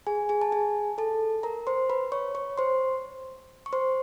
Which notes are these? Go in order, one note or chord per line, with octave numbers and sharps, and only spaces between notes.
G#4 G#5
G#4 G#5
A5
G#4 G#5
A4 A5
A#4 A#5
C5 C6
B4 B5
C#5 C#6
C#5 C#6
C5 C6
C#6
C5 C6